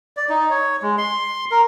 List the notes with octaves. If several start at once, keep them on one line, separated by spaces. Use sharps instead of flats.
D5
D#4
C#5
G#3
C6
A#4